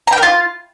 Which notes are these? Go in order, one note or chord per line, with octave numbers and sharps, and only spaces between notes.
A#5
G5
A#4
F4